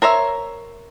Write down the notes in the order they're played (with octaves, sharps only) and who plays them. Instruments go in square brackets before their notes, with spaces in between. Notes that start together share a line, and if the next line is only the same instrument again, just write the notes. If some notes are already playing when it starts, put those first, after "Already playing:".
[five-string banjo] A#4 C5 C#5 E5